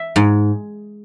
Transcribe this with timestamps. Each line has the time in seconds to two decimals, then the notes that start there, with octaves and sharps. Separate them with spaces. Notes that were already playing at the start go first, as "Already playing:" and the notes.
Already playing: E5
0.16 G#2